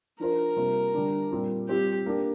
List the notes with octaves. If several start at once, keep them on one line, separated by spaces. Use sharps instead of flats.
F3 D4 F4 A#4 C5
C3 G3 A#3 F4 C5
D3 G3 D4
A#2 G3 C4 F4
G3 C4 F4 G4 C5
A#3 D4 G4